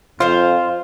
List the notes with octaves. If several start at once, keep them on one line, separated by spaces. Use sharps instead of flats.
F2 F4 C5 F5